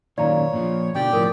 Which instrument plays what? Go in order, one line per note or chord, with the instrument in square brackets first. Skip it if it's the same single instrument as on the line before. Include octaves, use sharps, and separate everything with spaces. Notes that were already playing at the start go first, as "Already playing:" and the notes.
[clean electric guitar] F#2 A#2 D#3 [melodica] C#5 [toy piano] D5 F5 A#5
[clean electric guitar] A#2 F3
[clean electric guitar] B2 D3 [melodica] G4 D5 G5
[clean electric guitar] A2 F3 [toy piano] A#4 D#6